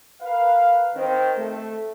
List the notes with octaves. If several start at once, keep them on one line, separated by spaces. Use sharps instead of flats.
A#4 B4 F5
D#3 C4
A3